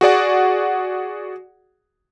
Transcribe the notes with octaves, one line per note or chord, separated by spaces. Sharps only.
F#4 G#4 D5 F#5